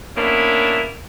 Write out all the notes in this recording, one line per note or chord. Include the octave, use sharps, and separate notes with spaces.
A#3 B3 C#4 D4 E4